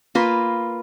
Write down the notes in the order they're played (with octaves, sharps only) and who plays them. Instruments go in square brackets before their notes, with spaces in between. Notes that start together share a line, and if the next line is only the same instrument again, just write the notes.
[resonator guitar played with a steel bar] A#3 F4 B4